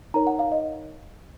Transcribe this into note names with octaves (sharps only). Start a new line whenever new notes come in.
D#4 A#4 C#5 A#5
F#5
F5
D#5